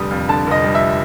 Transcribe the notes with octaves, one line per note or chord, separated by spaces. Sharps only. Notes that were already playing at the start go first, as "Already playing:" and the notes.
Already playing: F1 D3 G3 D#6
F2
D3 A5
F1 D#5
G3
E5